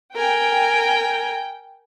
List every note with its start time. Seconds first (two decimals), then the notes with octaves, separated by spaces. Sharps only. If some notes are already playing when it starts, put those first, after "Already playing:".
0.15 A#4 G5 G#5